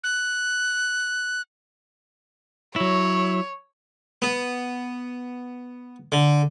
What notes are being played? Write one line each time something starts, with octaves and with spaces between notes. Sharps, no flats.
F#6
F#3 E4 C#5
B3
D3